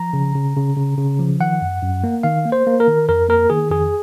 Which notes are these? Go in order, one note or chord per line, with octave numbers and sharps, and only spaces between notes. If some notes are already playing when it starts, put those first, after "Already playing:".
Already playing: F3 A#5
C#3
C#3
C#3
C#3
C#3
F3
D#3 F#5
F#2
F#2
A#3
D#3 F5
A#3
C5
A#3
A#4
D#3
F2 A#4
A#3 A#4
D#3 G#4
F2 G#4